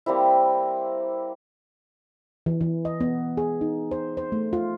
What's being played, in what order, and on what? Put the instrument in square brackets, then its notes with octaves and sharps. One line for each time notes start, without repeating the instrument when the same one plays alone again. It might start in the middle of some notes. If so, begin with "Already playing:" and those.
[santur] G3 A#3 C4 E4
[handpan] E3
E3
D#5
B3
G#4
D#4
C5
C5
A3
F4